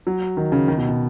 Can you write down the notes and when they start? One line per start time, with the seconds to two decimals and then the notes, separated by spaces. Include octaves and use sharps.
0.07 F#3
0.37 D#3
0.52 C#3
0.68 D#3
0.77 B2
0.89 B2